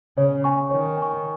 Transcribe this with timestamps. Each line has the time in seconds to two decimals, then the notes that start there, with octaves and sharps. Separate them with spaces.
0.17 C#3 C#5
0.44 G#5 C#6
0.71 D#3 C#5
0.97 G#5 C#6